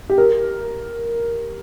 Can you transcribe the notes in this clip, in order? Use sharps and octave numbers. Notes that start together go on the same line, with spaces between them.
G4
A#4